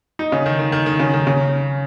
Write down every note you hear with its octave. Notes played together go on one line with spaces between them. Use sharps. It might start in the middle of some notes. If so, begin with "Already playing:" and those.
D#4
C#3
D#3
D#3
D#3
D#3
C#3
D#3
C#3